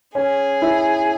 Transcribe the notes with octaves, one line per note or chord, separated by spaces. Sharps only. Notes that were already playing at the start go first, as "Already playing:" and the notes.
C#4 G#4
E4